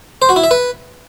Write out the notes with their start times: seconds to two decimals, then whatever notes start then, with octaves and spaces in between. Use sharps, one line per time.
0.22 C5
0.29 F#4
0.36 E4
0.44 E5
0.51 B4